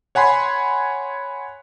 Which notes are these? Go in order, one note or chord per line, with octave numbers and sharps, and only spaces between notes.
C#5 F#5 G#5 B5 C6